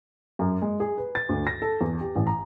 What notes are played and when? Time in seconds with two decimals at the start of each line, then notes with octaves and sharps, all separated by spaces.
0.39 F#2
0.62 G#3
0.80 G#4
0.98 B4
1.15 A6
1.29 D2
1.47 A#6
1.62 A4
1.81 E2
2.01 G4
2.16 A1
2.27 A#5